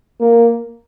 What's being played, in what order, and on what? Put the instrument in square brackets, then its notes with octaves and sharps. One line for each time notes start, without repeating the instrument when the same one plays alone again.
[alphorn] A#3